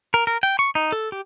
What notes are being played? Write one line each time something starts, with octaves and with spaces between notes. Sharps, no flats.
A#4
A#4
G5
C#6
D#4
A4
G4